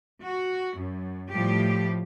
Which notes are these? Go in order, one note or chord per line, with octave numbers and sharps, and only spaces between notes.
F#4
F#2
A2 F3 G3 G4